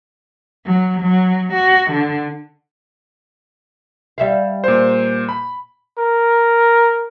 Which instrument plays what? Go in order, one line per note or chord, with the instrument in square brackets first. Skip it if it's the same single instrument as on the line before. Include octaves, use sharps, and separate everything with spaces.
[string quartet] F#3
F#3
F#4
D3
[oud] G3 E5 F5
[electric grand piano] A#2 C5
B5
[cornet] A#4